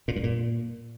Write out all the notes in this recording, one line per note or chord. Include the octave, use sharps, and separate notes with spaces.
A#2
G2
A#2